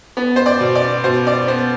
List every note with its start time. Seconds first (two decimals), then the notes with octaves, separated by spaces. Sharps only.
0.17 B3
0.36 C5
0.46 D5
0.60 B2
0.75 D5
1.04 B2 C5
1.27 D5
1.47 B3 C5